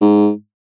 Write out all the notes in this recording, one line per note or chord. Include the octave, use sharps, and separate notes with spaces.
G#2